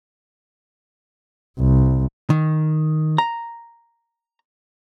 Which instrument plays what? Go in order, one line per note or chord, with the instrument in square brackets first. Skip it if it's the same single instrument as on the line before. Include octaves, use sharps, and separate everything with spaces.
[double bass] C2
[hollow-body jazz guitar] D#3
A#5